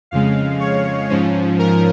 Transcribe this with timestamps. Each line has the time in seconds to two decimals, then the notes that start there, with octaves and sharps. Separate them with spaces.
0.11 F2 C#3 G#3 F5
0.60 C#5
1.10 G#2 F3 C#4
1.59 A#4